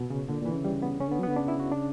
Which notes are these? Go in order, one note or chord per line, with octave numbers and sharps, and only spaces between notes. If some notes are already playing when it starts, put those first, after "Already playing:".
Already playing: B2
C#3
A#2 D3
A#2 E3
C#3
G3
B3
C#3 C#4
D3 B3
F#3
D3 B3
C#3 D4
E4
F#4
D4